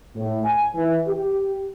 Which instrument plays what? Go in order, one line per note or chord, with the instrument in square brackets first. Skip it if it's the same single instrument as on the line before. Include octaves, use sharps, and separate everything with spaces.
[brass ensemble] A2
G#5
E3
G4